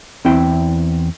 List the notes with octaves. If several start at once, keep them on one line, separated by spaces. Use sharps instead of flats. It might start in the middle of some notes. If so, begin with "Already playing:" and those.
E2 C4 E4 G5